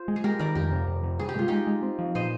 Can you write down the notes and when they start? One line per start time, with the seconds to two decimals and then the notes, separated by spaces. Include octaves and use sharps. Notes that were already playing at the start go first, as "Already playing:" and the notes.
Already playing: F4 C5
0.08 G#3
0.16 G#4
0.24 G#3 G4 A#4
0.39 D#3 A#4 D5
0.55 F2 G4 A#4
0.72 C3
0.88 F2
1.03 C3
1.19 G2 G#4
1.29 G4
1.36 G#3 F4
1.48 G#3 D#4 G4
1.67 G#3
1.83 C4
1.99 F3
2.15 A#2 C5 D#5